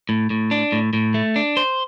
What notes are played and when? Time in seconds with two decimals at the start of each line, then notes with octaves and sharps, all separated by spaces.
0.09 A2
0.30 A2
0.51 D4
0.72 A2
0.93 A2
1.14 A3
1.36 D4
1.57 C5